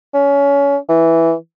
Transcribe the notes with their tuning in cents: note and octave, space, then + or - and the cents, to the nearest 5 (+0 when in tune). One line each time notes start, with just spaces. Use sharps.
C#4 +25
E3 +0